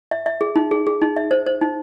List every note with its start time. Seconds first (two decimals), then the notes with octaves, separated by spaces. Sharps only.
0.11 E5
0.26 E5
0.41 G#4
0.56 D#4
0.71 G#4
0.87 G#4
1.01 D#4
1.16 E5
1.31 C5
1.46 C5
1.61 D#4